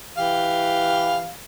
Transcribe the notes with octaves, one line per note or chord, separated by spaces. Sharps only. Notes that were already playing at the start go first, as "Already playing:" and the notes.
E3 G4 F5